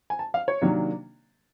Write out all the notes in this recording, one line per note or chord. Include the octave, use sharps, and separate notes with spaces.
G#5
A5
F5
C#5
C3 D#3 F#3 A#3 D4